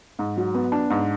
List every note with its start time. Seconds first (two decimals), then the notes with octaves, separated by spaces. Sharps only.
0.19 G#2
0.37 F#3
0.54 B3
0.72 D4
0.90 G#2